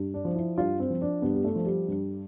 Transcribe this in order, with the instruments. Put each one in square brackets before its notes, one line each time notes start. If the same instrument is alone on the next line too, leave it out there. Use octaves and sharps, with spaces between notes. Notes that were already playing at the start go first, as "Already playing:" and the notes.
Already playing: [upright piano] G2
D4
F3
E4
G2 F4
C4
F3
D4
G2 B3
G3
A3
F3
G3
G2